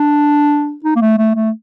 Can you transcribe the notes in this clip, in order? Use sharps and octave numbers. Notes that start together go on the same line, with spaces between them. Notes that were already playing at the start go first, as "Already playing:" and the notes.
Already playing: D4
D#4
A#3
A3
A3
A3